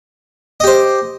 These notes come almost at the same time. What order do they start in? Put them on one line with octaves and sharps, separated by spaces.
D#5 G4 C5